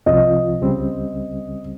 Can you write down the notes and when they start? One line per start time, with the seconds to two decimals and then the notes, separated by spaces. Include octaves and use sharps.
0.06 C2 C3 F3 C4 F4 D#5
0.61 C#2 C#3 G3 C4